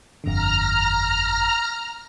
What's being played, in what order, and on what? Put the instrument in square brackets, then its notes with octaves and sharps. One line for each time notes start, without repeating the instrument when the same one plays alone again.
[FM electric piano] G1 F2 D3 [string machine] A#5 F6